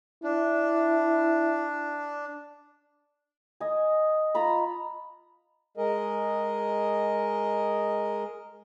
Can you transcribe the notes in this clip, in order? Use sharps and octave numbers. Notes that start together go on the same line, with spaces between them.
D4 E4
D#5 G#5
F4 A#5 B5
G#3 G#4 A#4 D#5